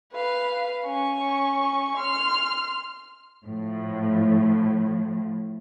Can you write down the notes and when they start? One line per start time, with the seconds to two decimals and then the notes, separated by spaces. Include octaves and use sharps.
0.13 B4 F5
0.85 C#4 C#6
1.97 C6 F6
3.45 A2 F3